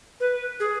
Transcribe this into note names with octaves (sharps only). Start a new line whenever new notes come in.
B4
G#4